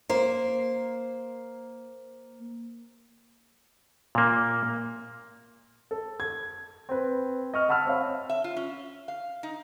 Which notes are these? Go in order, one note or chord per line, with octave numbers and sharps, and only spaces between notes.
A#3 C5
A#2 A#3
A4
G#6
C4 B4
D#5 C#6 F6
F#5 A5 B5 E6 F6
C4 C#5 F5
E5
F4
C#4
F5
D#4